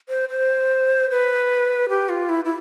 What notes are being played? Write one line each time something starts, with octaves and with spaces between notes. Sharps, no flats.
C5
C5
B4
G4
F4
E4
E4